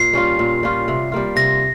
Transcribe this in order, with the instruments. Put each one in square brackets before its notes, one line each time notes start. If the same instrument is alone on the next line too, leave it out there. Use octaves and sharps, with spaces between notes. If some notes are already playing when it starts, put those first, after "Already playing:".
Already playing: [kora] A#2 [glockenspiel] C7
[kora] G3 C#4 F4
A#2
G3 C#4 F4
C3
G3 A#3 F4
[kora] C3 [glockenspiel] A#6